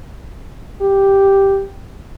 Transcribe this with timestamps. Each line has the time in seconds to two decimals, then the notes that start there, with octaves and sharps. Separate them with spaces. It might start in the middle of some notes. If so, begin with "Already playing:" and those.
0.81 G4